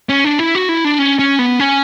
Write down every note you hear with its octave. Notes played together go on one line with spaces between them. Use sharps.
C#4
D4
E4
F#4
E4
D4
C#4
C#4
B3
C#4